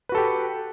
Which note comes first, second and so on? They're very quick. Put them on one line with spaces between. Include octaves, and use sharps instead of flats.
B4 F#4 A4 G4